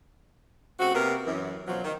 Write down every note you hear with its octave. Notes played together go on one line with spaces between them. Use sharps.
C#3 A3 C4 F#4
C3 A#3 B3 A#4
F#2 E3
B2 F3 F#3
D#3